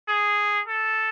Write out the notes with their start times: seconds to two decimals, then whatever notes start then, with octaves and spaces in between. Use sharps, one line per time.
0.09 G#4
0.68 A4